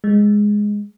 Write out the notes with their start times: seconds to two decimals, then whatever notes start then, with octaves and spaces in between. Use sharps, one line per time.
0.04 G#3